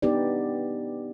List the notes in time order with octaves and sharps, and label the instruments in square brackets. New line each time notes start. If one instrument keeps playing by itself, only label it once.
[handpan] B3 D4 D#4 G4 B4 D5